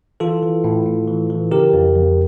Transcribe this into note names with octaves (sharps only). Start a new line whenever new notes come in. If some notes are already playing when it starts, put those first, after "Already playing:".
E3 F4 A4
E3
A2
A2
E3
E3
C#3 G4 A#4
F2
F2